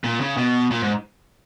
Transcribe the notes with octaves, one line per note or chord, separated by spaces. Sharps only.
A#2
C#3
B2
A#2
G#2